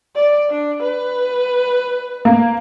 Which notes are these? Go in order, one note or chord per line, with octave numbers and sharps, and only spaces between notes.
D5
D4
B4
A#3